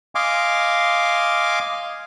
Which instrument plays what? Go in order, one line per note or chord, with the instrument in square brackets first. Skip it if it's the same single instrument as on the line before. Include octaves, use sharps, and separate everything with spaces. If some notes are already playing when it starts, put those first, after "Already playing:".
[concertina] D#5 F5 G#5 C6 D6